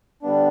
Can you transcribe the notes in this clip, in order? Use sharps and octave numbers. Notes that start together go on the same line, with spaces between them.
D3 G3 B3 D4